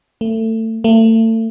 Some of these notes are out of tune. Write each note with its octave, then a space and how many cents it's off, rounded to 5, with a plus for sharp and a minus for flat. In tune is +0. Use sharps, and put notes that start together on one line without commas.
A3 +25
A3 +35